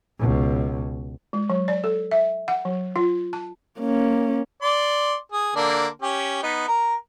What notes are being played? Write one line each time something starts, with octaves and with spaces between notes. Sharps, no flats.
C#2 B2
G#3
F#3
D5
A4
E5
F#5
F#3
F4
A5
A#3 C#4
D5 C6
G#4
D3 A#3 D4
C#4 G4
B3 D#4
A#4 A#5